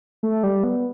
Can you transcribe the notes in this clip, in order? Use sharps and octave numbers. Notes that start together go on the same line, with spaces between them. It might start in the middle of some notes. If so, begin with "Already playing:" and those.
A3
G3
B3